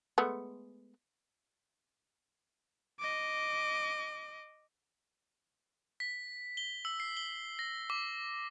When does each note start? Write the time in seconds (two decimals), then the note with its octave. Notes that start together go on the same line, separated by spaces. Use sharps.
0.18 G#3 A3 B3
3.00 D#5 D6
6.00 B6
6.57 G7
6.85 E6
7.00 C7
7.17 G7
7.59 A#6
7.90 D6